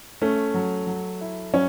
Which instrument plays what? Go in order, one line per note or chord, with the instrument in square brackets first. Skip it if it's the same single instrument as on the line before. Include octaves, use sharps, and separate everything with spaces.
[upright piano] A3 [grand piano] C#4
[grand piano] F#3
F#3
E4
[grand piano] F#3 [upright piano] C#4